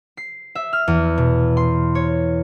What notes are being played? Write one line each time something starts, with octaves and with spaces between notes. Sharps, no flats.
C7
E5
F6
E2
B2
C6
C#5